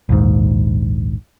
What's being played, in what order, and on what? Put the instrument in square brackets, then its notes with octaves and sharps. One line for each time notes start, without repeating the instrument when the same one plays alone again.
[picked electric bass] A#1 D#2 G#2